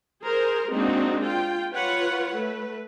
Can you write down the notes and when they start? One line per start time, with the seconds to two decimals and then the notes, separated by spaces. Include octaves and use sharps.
0.23 G#4 A#4 C5
0.69 G#3 A#3 C4 D4 D#4 F#4
1.24 F4 G5
1.72 F4 B4 C#5 F#5
2.33 A3 B4